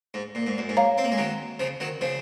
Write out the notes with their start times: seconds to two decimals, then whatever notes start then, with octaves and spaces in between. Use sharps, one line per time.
0.14 G#2
0.35 A#2
0.47 G#2
0.58 F#2
0.69 G#2
0.77 C#5 F5 A#5
0.98 C4
1.04 A#3
1.12 G#3
1.18 D#3 F#3
1.59 C#3 F3
1.80 D#3 F#3
2.01 C#3 F3